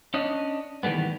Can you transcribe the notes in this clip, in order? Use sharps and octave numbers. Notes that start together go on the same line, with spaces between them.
C#4 D4 D#5
D#3 E3 G3 A3 B3